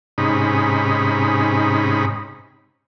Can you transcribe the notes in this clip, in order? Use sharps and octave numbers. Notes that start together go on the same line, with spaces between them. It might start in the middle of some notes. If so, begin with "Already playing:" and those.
G#2 C3 C#4 D#4 B5